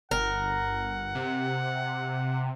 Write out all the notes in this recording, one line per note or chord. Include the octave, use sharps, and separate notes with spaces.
G1 A#4 F#5
C3